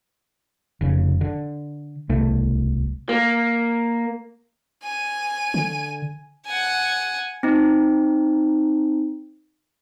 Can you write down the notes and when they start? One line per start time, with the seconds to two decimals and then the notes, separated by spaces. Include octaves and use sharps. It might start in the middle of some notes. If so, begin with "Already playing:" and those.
0.81 F1 C#3
1.21 D3
2.10 D1 C2 B2 A3
3.09 A#3
4.83 G#5 D#7
5.54 D3
6.47 F#5 G#5
7.43 C4 D#4